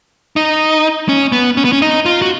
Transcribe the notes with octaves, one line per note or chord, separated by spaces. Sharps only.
D#4
C#4
B3
C#4
B3
C#4
D#4
F4
F#4